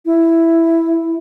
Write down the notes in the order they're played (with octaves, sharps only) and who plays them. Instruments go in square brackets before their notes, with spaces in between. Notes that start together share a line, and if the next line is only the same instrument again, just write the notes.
[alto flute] E4